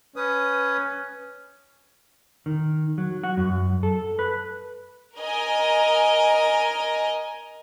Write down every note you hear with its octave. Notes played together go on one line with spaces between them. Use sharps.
C#4 B4 D#6
D#3
F#3
F#4
F#2
A4
B4
A#4 D#5 G#5